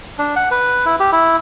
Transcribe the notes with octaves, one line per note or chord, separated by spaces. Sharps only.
D4
F#5
B4
E4
G4
E4